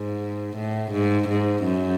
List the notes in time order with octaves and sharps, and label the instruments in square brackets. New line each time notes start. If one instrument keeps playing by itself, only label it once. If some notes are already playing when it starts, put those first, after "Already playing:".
Already playing: [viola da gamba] G#2
A2
G#2
G#2
F#2